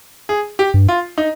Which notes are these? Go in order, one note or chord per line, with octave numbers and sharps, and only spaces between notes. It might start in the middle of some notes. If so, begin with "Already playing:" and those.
G#4
G4
G2
F4
D#4